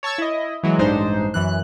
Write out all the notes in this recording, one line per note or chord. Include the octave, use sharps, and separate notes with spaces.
C#5 A5 C#6 E6 G#6
E4 D#5
E3 F#3 G#3
A1 G2 G#3 D4 D#4 C5
F#2 E3 F#6